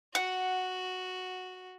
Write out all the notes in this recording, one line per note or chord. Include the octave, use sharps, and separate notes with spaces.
F#4 F#5